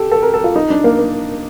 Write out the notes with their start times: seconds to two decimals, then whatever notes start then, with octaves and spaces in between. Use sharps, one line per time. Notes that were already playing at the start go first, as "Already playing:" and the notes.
Already playing: G4 A4
0.11 A4
0.23 A#4
0.34 A4
0.44 F4
0.56 D#4
0.70 D4
0.84 A#3
0.99 A#3